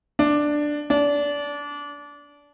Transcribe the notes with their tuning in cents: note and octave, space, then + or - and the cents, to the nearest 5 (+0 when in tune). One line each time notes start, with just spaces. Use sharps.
D4 +5
D4 -25